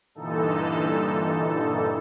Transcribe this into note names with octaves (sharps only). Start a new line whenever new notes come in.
G2 A#2 D3 E3 D#4 A4